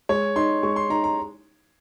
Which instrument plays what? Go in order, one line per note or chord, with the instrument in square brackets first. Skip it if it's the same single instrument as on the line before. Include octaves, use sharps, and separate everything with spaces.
[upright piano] G#3 [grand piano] C#5
[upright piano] D#4 [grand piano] C6
[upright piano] G#3 [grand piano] C#6
[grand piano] C6
[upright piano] D#4 [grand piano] A#5
[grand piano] A#5